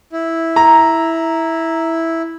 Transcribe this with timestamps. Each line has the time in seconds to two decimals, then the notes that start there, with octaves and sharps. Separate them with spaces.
0.12 E4
0.56 A#5